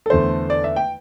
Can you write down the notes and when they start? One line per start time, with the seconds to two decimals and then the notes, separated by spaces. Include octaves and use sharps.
0.06 A4
0.10 E2 D3 A3 C5
0.50 D5
0.64 E5
0.76 G5